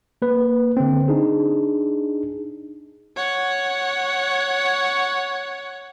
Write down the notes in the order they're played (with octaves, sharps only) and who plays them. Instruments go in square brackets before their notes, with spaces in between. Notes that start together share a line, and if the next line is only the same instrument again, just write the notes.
[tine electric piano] A#3 B4
D3 C4
D4 D#4 G#4
[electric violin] C#5 F#5